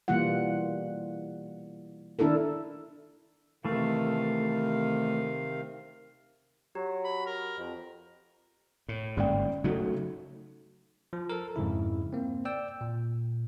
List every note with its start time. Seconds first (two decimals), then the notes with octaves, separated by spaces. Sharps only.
0.08 B2 E3 G3 A#3 F4 F#5
2.19 D#3 D4 E4 A4 A#4
3.65 C3 D#3 E3 A3 F5
6.75 F#3 G4
7.04 B5
7.26 A#4
7.58 F2
8.89 A2
9.17 G1 G#2 A#3 C#4 D5 G5
9.64 C#3 F#3 A3 D#4 F#4 A4
11.13 F3
11.30 A4 A#4
11.56 F2 G#2 C#3 E4
12.13 A#3 C4
12.45 D5 G5 E6
12.81 A#2